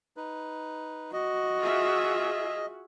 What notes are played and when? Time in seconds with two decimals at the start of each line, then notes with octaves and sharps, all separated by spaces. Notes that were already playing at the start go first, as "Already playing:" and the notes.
0.17 D#4 B4
1.13 F#4 D#5
1.62 F4 G#4 E5